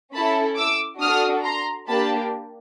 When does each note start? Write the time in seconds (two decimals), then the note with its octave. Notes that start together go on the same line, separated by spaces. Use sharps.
0.14 C#4 E4 A4 A5 B5
0.58 D6 E6
1.01 D4 F#4 A4 D#6 F6
1.44 A#5 C6
1.88 A#3 D4 G4 A5 B5